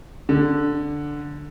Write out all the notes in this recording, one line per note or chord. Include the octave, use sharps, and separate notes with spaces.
D3